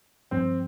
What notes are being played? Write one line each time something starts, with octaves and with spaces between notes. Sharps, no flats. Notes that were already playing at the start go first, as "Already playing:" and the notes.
G2 F3 G#3 C4